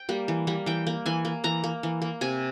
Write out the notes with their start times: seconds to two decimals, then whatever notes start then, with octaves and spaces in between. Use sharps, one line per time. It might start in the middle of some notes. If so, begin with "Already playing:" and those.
Already playing: G5
0.09 G3 A#3
0.28 E3
0.47 G3 A#3
0.66 E3 G5
0.87 A#3
1.06 E3 G#5
1.25 A#3
1.44 E3 A#5
1.64 A#3
1.83 E3
2.02 A#3
2.21 C3 G#5